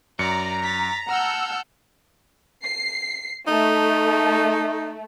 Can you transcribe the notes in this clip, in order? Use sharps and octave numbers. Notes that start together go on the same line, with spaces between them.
F#2 D5 A#5 C#7
A6 B6
F#5 A5 A#5 E6 F6 G6
C7
A3 D#4